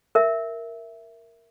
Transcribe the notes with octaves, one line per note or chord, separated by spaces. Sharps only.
A#4 E5